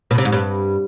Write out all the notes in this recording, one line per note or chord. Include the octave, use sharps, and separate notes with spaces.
B2
C3
G#2
G2